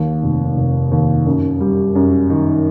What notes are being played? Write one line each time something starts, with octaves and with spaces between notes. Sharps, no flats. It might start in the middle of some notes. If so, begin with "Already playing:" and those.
Already playing: D#2
F1
F1
D#2
F#2
G3
F#2
D#3